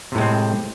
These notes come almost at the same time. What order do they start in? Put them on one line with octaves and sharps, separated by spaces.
C3 A2 G#3 C4